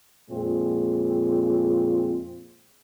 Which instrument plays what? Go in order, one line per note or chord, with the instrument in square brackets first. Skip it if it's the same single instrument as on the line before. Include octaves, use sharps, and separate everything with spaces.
[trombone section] F2 A#2 G#3 C4 F4